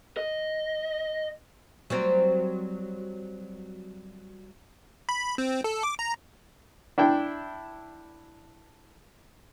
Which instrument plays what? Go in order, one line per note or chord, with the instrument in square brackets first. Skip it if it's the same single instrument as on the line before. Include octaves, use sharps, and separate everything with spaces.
[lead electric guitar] D#5
[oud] F#3 G3 C4
[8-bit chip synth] B5
C4
A4
D6
A#5
[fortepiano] D4 E4 G5